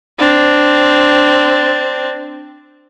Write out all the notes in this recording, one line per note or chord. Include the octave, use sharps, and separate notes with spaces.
C4 D4